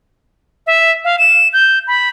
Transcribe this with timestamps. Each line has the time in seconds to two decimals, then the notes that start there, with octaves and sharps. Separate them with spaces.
0.67 E5
1.04 F5
1.19 E7
1.53 G6
1.87 B5